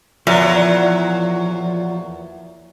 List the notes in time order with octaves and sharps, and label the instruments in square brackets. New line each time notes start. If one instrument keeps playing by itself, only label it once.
[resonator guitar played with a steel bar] E2 [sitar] A#2 F#3 [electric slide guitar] F3